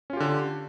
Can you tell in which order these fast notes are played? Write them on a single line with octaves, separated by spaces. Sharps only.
C#4 F4 G4 D3